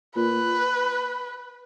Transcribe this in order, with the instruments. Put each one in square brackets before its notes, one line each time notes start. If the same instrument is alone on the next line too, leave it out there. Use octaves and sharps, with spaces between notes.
[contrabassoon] A#2 [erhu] B4